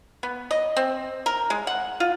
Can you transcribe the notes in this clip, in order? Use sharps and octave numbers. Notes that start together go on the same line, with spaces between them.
B3
D#5
C4
A#4
G#3
F#5
F4